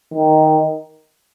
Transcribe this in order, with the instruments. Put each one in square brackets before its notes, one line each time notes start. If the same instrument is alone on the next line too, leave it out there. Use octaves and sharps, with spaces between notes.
[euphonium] D#3